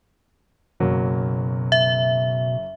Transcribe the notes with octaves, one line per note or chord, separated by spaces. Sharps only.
F#1 B2 F#3 A#3
E5